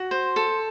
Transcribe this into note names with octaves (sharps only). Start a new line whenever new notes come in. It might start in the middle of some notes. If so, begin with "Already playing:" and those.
Already playing: F#4
C5
A4